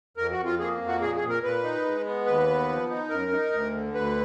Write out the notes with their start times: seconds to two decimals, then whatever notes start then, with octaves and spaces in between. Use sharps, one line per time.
0.17 F2 A#4
0.32 F#4
0.38 F2
0.45 F4
0.59 A#3 G#4
0.80 F2
0.87 F#4
1.01 A#2 G#4
1.15 G#4
1.22 A#2
1.29 A#4
1.43 A#2 B4
1.63 D#4
1.85 G#3
2.05 B3
2.26 D#2 B4
2.48 B3
2.69 F3
2.90 D#4
3.10 F#2 A#4
3.31 D#4
3.52 D2
3.73 D3
3.93 D2 B4